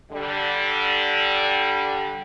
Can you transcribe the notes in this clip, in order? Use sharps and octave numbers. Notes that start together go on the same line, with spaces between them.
D3 G3